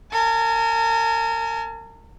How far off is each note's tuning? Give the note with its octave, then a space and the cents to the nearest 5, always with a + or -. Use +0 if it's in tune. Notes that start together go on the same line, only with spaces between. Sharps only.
A#4 -35 G#5 +40